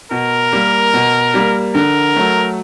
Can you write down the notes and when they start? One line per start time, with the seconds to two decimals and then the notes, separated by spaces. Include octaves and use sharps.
0.11 B2 A#4
0.53 G3 A#3
0.94 B2
1.34 G3 A#3
1.75 D3 A#4
2.16 F#3 A3